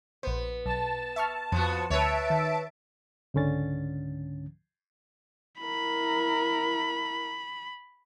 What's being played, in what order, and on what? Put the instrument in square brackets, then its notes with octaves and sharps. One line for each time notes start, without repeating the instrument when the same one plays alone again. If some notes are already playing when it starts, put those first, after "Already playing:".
[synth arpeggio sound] A#1 C5 [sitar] B3
[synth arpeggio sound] B1 [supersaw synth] A5
[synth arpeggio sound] E5 C#6 F6
[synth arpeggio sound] F2 [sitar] F3 B3 F#4
[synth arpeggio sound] D2 [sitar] B4 C#5 [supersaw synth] E5 A5 D7
[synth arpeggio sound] D#3
[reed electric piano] C#2 G#2 D3 C#4 A6
[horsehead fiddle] E4 A#4 [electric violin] B5